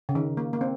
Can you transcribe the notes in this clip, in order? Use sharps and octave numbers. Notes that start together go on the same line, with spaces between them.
C#3
D#3
A#3
A#3
C4